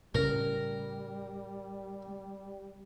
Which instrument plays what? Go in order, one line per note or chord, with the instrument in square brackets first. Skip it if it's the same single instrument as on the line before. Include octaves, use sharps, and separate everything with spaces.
[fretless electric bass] A2 C#3 C#4 [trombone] G3 [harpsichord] A#4